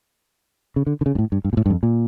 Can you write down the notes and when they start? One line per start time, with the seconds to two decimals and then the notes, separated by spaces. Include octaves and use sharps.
0.76 C#3
0.87 D3
1.01 D3
1.06 C#3
1.15 G2
1.18 A2
1.32 G2
1.45 G2
1.53 A#2
1.57 A2
1.66 G2
1.70 F2
1.83 A#2